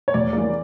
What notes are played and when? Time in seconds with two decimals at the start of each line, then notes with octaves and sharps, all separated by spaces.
0.08 C#5
0.14 E2 D5
0.33 E3 G3 A#3